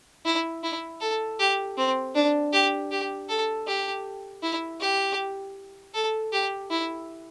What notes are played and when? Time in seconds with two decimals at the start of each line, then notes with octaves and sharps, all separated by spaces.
0.25 E4
0.63 E4
1.01 A4
1.39 G4
1.78 C4
2.15 D4
2.53 G4
2.91 G4
3.29 A4
3.67 G4
4.43 E4
4.80 G4
5.94 A4
6.32 G4
6.71 E4